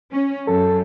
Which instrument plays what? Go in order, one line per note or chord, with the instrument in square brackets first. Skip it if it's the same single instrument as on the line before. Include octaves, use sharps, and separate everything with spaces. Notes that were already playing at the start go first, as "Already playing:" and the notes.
[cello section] C#4
[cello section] F#2 [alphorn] A4